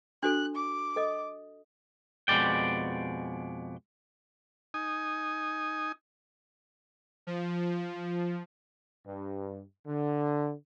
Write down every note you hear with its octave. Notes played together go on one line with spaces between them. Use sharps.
D4 F#4 A4 F#6
D6
A4 D#5 D#6
F2 B2 G#3 D5 G5
D#4 G#5 D#6
F3
G2
D3